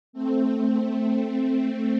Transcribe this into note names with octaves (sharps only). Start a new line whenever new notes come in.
A3 C4